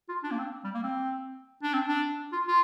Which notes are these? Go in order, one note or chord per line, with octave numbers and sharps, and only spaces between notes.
F4
D4
A#3
C4
G3
A#3
C4
D4
C4
D4
F4
F4